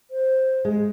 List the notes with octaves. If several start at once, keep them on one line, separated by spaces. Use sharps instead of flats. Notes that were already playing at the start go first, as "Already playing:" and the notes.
C5
G#3